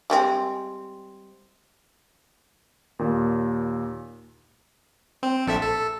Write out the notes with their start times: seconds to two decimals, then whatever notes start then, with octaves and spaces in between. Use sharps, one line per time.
0.10 G3 G#3 C4
2.99 D#2 A#2
5.23 C4
5.47 A#1 A4 E5
5.61 A4